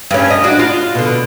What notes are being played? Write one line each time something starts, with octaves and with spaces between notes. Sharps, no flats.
G2 C#4
D#5
D4 F#4
F4
B2 D3